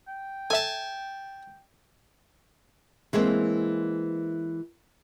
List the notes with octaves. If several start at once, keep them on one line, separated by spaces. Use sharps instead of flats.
G5
A4 E5 G#5 A5
E3 G#3 A#3 C4